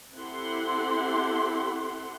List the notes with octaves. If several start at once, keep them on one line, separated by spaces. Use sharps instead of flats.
C4 E4 G4 A4 F#5 C6